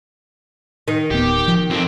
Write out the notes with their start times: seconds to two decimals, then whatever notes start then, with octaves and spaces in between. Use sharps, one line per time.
0.88 D#3
1.11 D1 B3 G4
1.48 F3
1.70 F2 C4